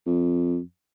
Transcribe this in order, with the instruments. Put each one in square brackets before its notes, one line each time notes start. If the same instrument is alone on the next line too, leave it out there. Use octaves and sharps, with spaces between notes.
[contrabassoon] F2